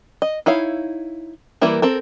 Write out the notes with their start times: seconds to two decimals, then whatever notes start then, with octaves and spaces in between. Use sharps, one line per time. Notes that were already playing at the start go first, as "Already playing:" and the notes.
0.22 D#5
0.46 D#4 E4 C#5 F5
1.61 E3 G3 A#3 E4 A#4
1.82 C4 A4 A#4